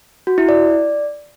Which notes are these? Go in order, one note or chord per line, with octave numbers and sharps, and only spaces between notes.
F#4
E4
D5